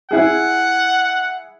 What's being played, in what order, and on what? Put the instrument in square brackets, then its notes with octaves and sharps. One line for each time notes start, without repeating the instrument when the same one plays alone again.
[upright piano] E4 G#4 [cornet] F#5